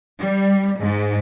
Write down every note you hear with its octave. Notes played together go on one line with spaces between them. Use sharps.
G3
G#2